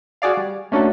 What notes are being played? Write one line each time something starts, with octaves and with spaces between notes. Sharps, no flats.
F#4 G#4 D5 F5
G3
A3 A#3 C#4 D4 F#4 A4